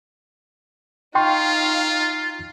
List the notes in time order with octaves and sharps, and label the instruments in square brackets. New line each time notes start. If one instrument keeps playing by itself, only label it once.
[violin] D#4 F5 [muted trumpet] F4 [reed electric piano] G5 C6 C#6